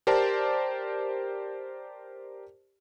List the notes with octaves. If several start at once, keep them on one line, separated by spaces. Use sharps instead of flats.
G4 A#4 C5 D5 A5